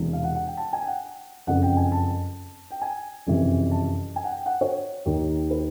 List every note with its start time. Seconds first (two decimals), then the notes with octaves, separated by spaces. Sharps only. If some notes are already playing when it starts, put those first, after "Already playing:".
Already playing: E1 E2 C3 E3
0.13 F5
0.24 F#5
0.35 F#5
0.47 G5
0.57 A5
0.73 G#5
0.82 G5
0.87 F#5
1.47 F#1 F2 C#3 F#5
1.62 G5
1.77 G#5
1.92 A5
2.71 G5
2.82 G#5
3.27 F#1 F2 C3 E3
3.71 A5
4.16 G#5
4.24 F#5
4.31 G5
4.46 F#5
4.61 C#5
5.05 D#2 D#3
5.51 B4